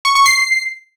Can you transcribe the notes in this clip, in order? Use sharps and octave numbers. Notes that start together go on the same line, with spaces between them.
C#6
C#6
C7